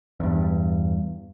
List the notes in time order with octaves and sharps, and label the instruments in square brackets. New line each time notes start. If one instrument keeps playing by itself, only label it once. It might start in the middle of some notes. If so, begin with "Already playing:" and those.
[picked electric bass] E2 G2